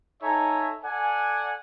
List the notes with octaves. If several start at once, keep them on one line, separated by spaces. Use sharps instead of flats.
D#4 A4 C#5 E5 G#5 A#5
A4 D5 F#5 G#5